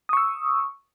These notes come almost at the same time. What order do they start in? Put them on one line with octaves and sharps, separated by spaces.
D#6 C#6 E6